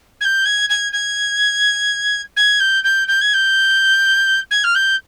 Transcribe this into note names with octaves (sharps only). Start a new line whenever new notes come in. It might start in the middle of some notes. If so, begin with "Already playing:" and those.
G#6
G6
G#6
G#6
G#6
G#6
G6
G6
G6
G#6
G6
G#6
F6
G6